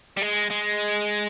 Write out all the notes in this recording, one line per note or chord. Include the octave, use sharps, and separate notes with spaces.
G3
G#3
G#3